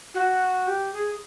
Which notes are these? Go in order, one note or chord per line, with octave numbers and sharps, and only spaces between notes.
F#4
G4
G#4